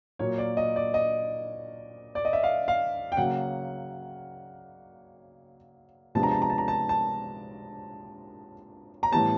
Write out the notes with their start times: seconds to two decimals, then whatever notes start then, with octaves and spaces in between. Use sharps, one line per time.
0.19 A#2 F#3 A#3 C#5
0.38 D5
0.57 D#5
0.76 D5
0.94 D#5
2.15 D5
2.25 D#5
2.33 E5
2.43 F5
2.68 F5
3.12 G5
3.17 C#3 F#3 A#3 F#5
6.15 C3 F3 G#3 B3 D4 A5
6.23 A#5
6.32 A5
6.42 A#5
6.50 A5
6.58 A#5
6.68 A5
6.89 A5
9.03 A#5
9.12 A2 E3 G3 B3 A5